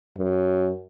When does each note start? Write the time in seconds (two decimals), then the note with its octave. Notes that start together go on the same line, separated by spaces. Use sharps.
0.17 F#2